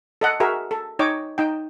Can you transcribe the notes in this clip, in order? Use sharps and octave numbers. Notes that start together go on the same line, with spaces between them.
A4 D#5 F#5
F#4 G#4 A#4 E5
A4
D#4 C#5 D#5 G5 D6
D#4 G5